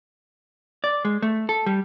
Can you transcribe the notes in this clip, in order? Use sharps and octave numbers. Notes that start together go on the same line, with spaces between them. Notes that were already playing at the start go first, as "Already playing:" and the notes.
D5
G#3
A3
A4
G3